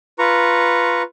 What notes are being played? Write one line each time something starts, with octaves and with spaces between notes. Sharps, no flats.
F4 B4 A#5 C#6